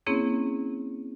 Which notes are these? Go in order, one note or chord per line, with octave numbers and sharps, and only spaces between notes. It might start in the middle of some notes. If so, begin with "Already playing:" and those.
A#3 C4 C#4 E4 G#4 C#5